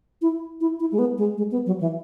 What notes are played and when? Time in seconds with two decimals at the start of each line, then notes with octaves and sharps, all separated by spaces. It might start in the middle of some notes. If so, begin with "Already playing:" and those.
0.22 E4
0.61 E4
0.80 E4
0.92 G#3
0.99 B3
1.18 G#3
1.38 G#3
1.52 B3
1.66 F#3
1.81 E3